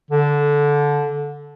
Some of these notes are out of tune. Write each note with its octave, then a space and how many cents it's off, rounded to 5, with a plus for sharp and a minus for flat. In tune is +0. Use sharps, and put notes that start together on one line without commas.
D3 -15